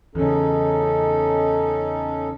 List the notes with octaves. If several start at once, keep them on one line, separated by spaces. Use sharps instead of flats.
E2 C#3 C#4 D#4 A4